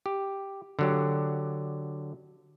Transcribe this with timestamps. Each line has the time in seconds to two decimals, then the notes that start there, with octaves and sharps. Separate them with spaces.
0.06 G4
0.79 D3 F#3 G4